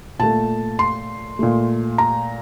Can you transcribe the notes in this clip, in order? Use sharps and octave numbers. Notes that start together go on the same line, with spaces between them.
A#2 A3 A5
C6
A#2 A3
A#5